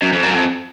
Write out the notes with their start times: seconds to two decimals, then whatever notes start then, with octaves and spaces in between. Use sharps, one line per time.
0.02 F#2
0.13 F2
0.23 F#2
0.33 F2